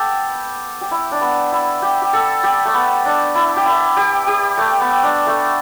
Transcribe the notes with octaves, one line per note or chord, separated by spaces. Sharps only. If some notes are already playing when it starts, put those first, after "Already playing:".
Already playing: B3 G4 A4
G4
E4
D4
B3
E4
G4
G4
A4
G4
A3
B3
D4
E4
G4
E4
G4
G4
A3
B3
D4
A3